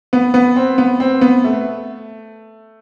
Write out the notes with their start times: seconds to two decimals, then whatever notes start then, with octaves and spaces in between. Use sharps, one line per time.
0.13 B3
0.34 B3
0.56 C4
0.78 B3
1.00 C4
1.21 B3
1.44 A3